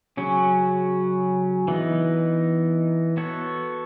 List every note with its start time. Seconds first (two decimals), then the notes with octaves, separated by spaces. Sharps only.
0.17 C#3 F#3 C#4
1.68 E3 B3 D#4
3.17 B3 F#4 A4 C#5